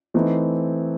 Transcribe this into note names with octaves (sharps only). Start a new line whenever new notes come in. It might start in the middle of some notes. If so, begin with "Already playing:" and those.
E3 A3 C4 D#4